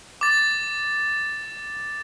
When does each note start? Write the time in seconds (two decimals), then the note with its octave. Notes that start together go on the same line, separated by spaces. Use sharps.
0.21 D6 A6